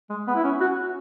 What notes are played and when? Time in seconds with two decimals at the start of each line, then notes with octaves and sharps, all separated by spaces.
0.10 G#3
0.28 B3
0.35 E4
0.44 C#4
0.61 F#4